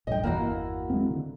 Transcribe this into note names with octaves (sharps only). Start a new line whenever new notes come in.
A#1 G2 D#5 G5
G1 E2 A#3 E4 F#4
G#3 C4
D3